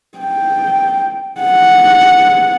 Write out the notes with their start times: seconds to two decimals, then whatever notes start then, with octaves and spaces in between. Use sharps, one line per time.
0.18 G5
1.41 F#5